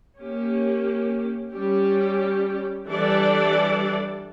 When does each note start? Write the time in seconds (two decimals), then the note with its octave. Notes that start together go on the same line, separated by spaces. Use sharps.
0.20 A#3 C#4 G4
1.53 G3 C#4 G4
2.86 E3 G3 D4 A4 D5